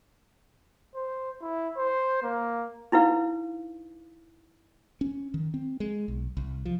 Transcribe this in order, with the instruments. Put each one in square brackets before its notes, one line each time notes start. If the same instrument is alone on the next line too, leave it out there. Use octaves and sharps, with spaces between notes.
[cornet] C5
E4
C5
A#3
[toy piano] D#4 E4 B4 F5
[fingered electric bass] C#4
D#3
C4
G#3
B1
C2
F3